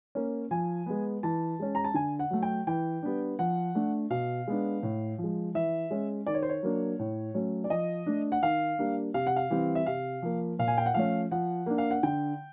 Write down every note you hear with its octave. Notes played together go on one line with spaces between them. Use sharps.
A#3 C#4
F3 G#5
G#3 B3
E3 A5
G#3 C#4
A#5
A5
D3 G#5
F#5
F#3 A3
G5
E3 G5
G3 B3 D4
F3 F#5
A3 D4
B2 F5
G#3 B3 D4
A2
F3
G#3
E3 E5
G#3 C#4
D#3 D5
C#5
C5
C#5
F#3 A#3 D4
A2
F#3 A3 C#4
D5
F3 D#5
A3 D4
F#5
D#3 F5
G3 A#3 D4
C3 F5
F#5
F5
E3 G3 C4
E5
C3 F5
F3 A#3
A#2 F5
G#5
G5
F#5
F3 A3 C#4 F5
F3 F#5
A#3 D4
F5
F#5
D3 G5